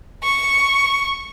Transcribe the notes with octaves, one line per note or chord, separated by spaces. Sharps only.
C#6